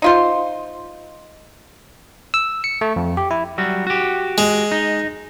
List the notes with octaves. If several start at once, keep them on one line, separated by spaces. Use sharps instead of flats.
D#4 F4 C5
E6
C#7
A3
F2
G4
E4
F#3 G3 F#4
F#4 G4
G#3
D#4